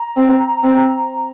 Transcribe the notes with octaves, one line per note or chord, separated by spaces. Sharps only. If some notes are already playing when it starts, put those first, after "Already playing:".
Already playing: A#5
C4
C4